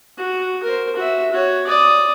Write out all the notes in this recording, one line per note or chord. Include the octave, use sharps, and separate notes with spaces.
F#4
A#4 C5
F#4 E5
F#4 C#5
D5 D#6